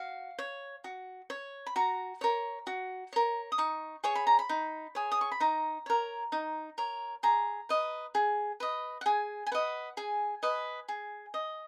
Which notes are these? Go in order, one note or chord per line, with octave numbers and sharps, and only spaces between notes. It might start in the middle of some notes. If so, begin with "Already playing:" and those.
Already playing: F#4 F5
C#5
F#4
C#5
B5
F#4 A#5
A#4 C#5
F#4
A#4 C#5
D#6
D#4 C#6
G#4 C#5 C#6
B5
A#5
B5
D#4
G#4 C#5
D#6
C#6
B5
D#4 A#5
A#4 C#5
D#4
A#4 C#5
G#4 A#5
B4 D#5
G#4
B4 D#5
F#5
G#4 G#5
G#5
B4 D#5 F#5
G#4 G#5
B4 D#5
G#4
D#5